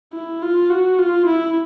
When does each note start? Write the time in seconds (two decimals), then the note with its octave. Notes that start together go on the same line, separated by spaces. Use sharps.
0.13 E4
0.42 F4
0.70 F#4
0.99 F4
1.26 E4